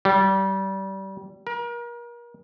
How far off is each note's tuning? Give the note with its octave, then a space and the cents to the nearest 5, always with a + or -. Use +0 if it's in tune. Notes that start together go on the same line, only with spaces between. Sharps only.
G3 -25
A#4 +35